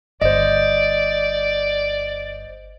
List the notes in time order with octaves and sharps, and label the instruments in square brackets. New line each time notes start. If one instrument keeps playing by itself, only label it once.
[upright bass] G1 [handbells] C5 D#5 [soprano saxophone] D5